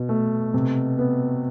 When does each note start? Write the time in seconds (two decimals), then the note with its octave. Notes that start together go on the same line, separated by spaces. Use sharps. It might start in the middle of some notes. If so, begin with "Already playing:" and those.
Already playing: B2
0.09 A3
0.54 C3
0.99 B3